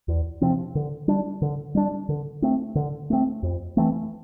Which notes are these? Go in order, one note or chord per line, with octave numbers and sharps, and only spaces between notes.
E2
C3 F3 C4
D3
G3 D4
D3
G3 D4
D3
A3 C4
D3
A3 C4
F2
E3 A3 C4